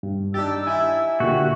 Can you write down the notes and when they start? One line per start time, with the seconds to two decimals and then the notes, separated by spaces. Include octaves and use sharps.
0.03 G2
0.34 D4 D#4 G4 E6 A6
0.67 E4 G#5
1.20 A#2 D3 F#4 G4